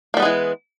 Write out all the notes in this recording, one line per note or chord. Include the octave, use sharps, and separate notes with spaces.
E3 G3 G#3 A#3 B3